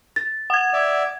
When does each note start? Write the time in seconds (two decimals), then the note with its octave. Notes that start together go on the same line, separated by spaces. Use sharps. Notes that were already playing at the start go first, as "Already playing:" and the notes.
0.16 A6
0.50 F#5 G#6
0.73 D5 E5